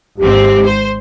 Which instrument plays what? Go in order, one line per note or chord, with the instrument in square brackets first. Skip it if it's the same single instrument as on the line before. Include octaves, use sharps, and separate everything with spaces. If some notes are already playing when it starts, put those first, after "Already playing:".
[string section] G#1 G#2 C4 [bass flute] G4
[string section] C5